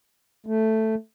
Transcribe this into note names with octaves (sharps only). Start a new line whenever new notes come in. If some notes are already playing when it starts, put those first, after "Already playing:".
A3